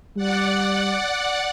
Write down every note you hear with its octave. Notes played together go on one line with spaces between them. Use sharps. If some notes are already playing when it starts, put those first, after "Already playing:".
G3 D5 F#5